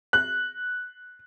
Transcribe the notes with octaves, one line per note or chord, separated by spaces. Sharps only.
F#6